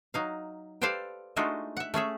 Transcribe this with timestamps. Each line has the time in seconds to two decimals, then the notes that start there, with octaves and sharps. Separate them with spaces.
0.14 F#3 D#4 F5
0.82 G4 A4 B4 C5 D5 F5
1.36 G#3 A3 D4 D#4 F4 F#4
1.77 E5 F#5
1.94 A3 C#4 G#4 E5